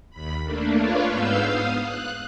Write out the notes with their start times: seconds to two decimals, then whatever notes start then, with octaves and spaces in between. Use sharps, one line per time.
0.10 D#2 B5
0.44 A3 A#3 D4
0.76 D4 F4 B4 C#5 F5
1.09 G#2 B3 F5 E6 G6
1.41 F5 D#6
1.79 F#6